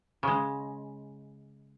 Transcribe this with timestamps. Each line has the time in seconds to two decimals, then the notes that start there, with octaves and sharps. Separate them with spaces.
0.23 C#3 G#3